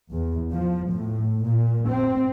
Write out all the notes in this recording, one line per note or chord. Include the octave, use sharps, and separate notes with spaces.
E2
F3
A2
A#2
C4